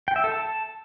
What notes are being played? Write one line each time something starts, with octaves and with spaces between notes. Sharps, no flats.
G5
E5
A4
A5